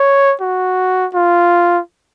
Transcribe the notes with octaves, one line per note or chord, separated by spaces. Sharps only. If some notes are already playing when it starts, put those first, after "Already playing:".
Already playing: C#5
F#4
F4